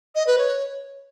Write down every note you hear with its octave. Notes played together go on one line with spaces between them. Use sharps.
D#5
B4
C#5